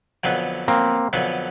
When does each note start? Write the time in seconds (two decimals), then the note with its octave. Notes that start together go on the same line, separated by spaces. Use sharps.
0.24 F2 D3 F#3 B3
0.68 A#3 C4
1.13 F2 D3 F#3 B3